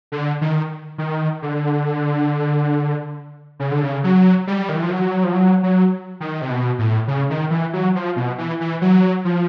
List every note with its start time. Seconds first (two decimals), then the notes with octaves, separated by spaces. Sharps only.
0.12 D3
0.41 D#3
0.98 D#3
1.42 D3
3.60 C#3
3.71 D3
3.83 C#3
4.04 F#3
4.47 G3
4.69 D#3
4.76 E3
4.83 F3
4.90 F#3
5.24 F3
5.33 F#3
5.63 F#3
6.20 D#3
6.41 C3
6.50 B2
6.79 A2
7.08 C#3
7.30 D#3
7.50 E3
7.73 F#3
7.95 F3
8.16 B2
8.38 E3
8.60 E3
8.82 F#3
9.25 F3